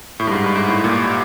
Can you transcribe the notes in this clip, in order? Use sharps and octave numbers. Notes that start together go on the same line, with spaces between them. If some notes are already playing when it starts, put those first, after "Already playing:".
A2
G2
G#2
G2
G#2
A2
A#2